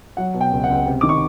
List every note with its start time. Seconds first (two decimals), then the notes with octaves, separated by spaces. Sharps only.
0.17 F#3 F#5
0.34 B2
0.41 G5
0.52 C#2
0.64 F#5
0.69 C#2
0.86 C3
1.01 D#3 D6
1.09 C#6